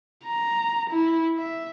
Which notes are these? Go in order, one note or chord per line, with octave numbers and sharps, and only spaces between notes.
A#5
E4
E5